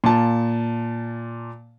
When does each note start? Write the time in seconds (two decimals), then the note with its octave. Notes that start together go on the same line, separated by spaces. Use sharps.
0.04 A#2 A5